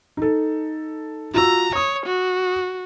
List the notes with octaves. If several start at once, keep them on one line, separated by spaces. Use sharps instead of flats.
D#4 A4
F4 F#4 A#5 E6
C#5 D#6
F#4